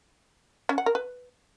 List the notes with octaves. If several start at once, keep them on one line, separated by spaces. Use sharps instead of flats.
C#4
F#5
A#4
B4